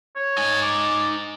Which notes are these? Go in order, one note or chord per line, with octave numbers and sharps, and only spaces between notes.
C#5
D#4 G#5
D6